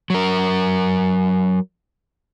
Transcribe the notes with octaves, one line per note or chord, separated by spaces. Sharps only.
F#3 A#4